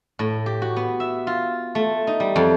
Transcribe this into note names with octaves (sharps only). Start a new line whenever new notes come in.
A2
G4
F#4
B3
E5
F4
A3
D#4
G3
F2